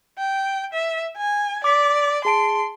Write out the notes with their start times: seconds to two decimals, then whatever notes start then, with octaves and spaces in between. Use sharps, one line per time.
0.19 G5
0.73 E5
1.17 G#5
1.64 D5 D6 B6
2.25 G#4 A5 C6 D7